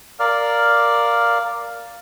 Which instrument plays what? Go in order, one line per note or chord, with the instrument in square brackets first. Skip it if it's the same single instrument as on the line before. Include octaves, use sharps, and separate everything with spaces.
[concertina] A#4 D5 F5